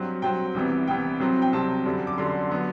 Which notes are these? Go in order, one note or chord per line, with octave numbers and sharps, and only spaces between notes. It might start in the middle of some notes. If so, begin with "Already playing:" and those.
Already playing: G2 F#3 C4
G2 F#3 C4 G5
C2 C3 E3 B3
C2 C3 E3 B3 G5
C2 C3 F#3 C4
G5
C2 C3 F#3 C4 A5
F#2 D3 G3
D6
F#2 D3 G3 C6
F#3 B3